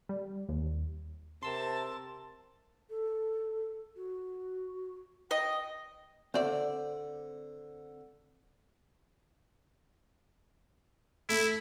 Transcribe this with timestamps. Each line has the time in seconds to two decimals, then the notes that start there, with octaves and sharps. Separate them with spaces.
0.09 G3
0.49 D#2
1.43 C3 A#4 A5 C6 E6
2.90 A4
3.96 F#4
5.31 D#5 G5
6.34 D3 C4 C5 D5 E5
11.29 A3 E4